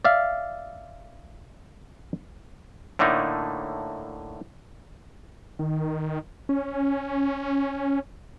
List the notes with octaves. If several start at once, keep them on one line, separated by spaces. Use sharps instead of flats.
D5 E5 F5
A2 D3 A3 A#3 D#4
D#3
C#4